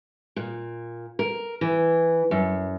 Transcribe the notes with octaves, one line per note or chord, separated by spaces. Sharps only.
A#2
A#4
E3
F#2